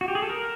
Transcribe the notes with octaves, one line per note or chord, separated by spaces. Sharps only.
F#4
G4
G#4
A4
A#4